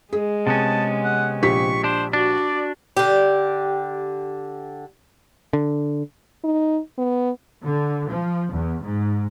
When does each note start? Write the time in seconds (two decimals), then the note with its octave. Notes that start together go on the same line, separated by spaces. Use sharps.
0.13 G#3 G#4
0.47 C3 B3 C#4 A5
1.04 F#5
1.43 A#1 G4 C#6 B6
1.84 D4 C5
2.13 D4 F#4 D5
2.97 D3 G4
5.53 D3
6.44 D#4
6.98 B3
7.63 D3
8.08 F3
8.52 E2
8.83 G#2